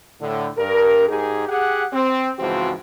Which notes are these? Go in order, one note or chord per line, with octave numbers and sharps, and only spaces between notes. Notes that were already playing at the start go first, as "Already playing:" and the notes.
A2 D3
G2 A#4
G#2 D#4 G4 G#4
G4 G#4 F#5
C4
C#2 G#2 E3 F3 C4 F#4